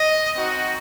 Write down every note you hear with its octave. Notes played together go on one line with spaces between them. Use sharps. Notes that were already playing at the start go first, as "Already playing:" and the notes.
Already playing: D#5
C4 D#4 F#4